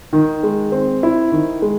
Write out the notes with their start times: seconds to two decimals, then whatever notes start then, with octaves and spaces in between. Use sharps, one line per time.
0.13 D#3
0.43 G#3
0.72 C4
1.03 E4
1.32 D#3
1.62 G#3